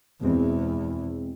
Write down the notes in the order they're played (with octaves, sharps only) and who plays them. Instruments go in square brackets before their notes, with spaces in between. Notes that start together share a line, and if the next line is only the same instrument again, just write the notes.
[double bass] E2 [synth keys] B2 G#3 C4